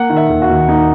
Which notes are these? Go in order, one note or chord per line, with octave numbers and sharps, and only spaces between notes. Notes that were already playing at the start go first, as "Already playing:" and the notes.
Already playing: A#3 F#5
D#3
E5
D#2
F#4
D#2
A#3 D#4